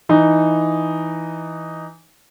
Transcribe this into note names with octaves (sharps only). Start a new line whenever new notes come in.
E3 D#4